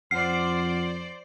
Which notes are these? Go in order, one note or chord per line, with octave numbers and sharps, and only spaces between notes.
F2 C5 D5 F#5 F6 C7